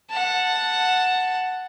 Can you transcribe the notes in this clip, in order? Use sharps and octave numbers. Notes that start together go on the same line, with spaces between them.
F#5 A5